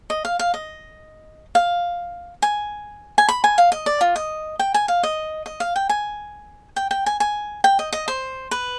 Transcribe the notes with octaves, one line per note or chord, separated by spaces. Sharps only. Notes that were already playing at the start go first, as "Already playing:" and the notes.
D#5
F5
F5
D#5
F5
G#5
G#5
B5
G#5
F5
D#5
D5
F4
D#5
G5
G#5
F5
D#5
D#5
F5
G5
G#5
G5
G5
G#5
G#5
G5
D#5
D#5
C5
B4